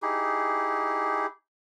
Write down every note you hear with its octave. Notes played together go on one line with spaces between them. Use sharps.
D#4 E4 G4 G#4